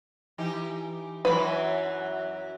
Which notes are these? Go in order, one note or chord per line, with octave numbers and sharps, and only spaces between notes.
E3 D#4 G4
F#2 E3 F#3 B4 B5